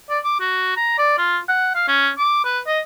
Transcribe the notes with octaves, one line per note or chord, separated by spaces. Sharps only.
D5
D6
F#4
A#5
D5
F4
F#5
F5
C#4
D6
B4
D#5